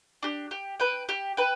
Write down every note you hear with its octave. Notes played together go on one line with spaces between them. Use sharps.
D4 G4
G4
B4 G5
G4
B4 G5